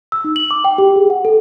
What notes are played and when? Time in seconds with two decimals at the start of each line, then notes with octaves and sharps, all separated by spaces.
0.12 E6
0.24 D#4
0.36 F#7
0.51 D6
0.64 G5
0.78 G4
0.96 G#4
1.10 F#5
1.25 A4